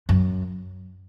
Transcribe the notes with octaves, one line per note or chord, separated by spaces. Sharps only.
F#2